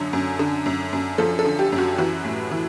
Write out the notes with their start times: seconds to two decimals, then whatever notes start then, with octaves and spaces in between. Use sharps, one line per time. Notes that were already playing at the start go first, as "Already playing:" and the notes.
Already playing: F#2 D3 F#3
0.13 F#2
0.39 D3
0.66 F#2
0.93 F#2
1.18 F3 A4
1.39 A4
1.45 D3
1.59 G4
1.72 F#2
1.78 F#4
1.98 E3 F#4
2.24 A2
2.51 E3